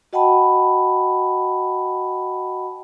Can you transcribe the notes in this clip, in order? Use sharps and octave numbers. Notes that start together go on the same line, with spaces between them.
F#4 D#5 F#5 G5 A5 B5